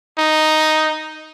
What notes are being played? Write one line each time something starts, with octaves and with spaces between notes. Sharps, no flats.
D#4